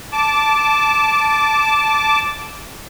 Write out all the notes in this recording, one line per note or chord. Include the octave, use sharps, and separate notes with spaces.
A5 D6